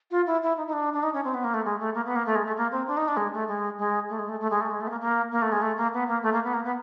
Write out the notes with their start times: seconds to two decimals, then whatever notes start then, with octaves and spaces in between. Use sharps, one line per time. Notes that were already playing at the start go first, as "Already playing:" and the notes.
0.11 F4
0.27 E4
0.43 E4
0.57 D#4
0.67 D#4
0.73 D4
0.93 D4
1.03 D#4
1.14 C#4
1.24 C4
1.34 B3
1.44 A#3
1.54 A3
1.65 G#3
1.79 A3
1.94 A#3
2.06 B3
2.16 A#3
2.26 A3
2.35 G#3
2.45 A3
2.57 A#3
2.72 C4
2.87 D4
2.97 D#4
3.08 D4
3.17 G#3
3.33 A3
3.48 G#3
3.78 G#3
4.09 A3
4.19 G#3
4.29 A3
4.40 A3
4.51 G#3
4.61 A3
4.71 G#3
4.81 A3
4.87 B3
4.90 A#3
5.00 A#3
5.31 A#3
5.42 A3
5.52 G#3
5.62 A3
5.77 A#3
5.93 B3
6.08 A#3
6.23 A3
6.33 A#3
6.44 B3
6.54 A#3
6.64 B3